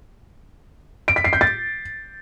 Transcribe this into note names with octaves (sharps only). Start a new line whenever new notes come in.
D7
B6
C7
G6
A6